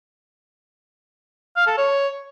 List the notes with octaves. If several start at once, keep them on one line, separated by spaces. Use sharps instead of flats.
F5
A4
C#5